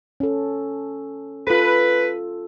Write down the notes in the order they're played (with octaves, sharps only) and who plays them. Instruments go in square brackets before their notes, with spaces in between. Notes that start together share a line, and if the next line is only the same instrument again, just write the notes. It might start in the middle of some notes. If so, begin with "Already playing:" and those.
[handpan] C#4 A4
[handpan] F4 A4 [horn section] B4